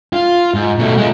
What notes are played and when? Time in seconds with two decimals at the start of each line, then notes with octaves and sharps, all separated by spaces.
0.13 F4
0.54 G#2
0.78 B2 A3
0.98 G#3 F4